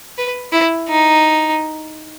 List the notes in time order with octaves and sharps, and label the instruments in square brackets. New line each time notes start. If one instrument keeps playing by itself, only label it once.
[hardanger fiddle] B4
E4
D#4